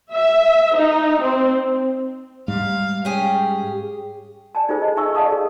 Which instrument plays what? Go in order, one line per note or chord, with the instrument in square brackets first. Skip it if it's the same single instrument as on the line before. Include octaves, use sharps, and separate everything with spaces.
[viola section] E5
D#4
C4
[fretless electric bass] G#2 G3 [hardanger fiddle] F5
[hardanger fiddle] C#4 [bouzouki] G4 G#4
[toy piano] D5 G#5 A5
D#4 F4 G#4 A4 C5 G#5
D#5
D#4 E5 G#5 C#6 E6
D5 D#5 F5 A5 D#6
G#4 A4